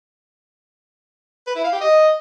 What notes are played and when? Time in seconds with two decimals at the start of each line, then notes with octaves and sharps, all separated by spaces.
1.47 B4
1.56 E4
1.64 F5
1.73 G4
1.81 D#5